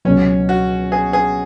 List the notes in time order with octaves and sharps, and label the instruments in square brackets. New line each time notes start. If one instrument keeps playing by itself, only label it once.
[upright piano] C#2 B2 F#3 [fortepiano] C#4
[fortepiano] F#4
G#4
G#4